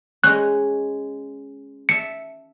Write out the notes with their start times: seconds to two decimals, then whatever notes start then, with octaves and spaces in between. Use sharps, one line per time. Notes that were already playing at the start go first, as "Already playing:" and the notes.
0.24 G#3 C#4 F#6
1.89 E5 A5 C#7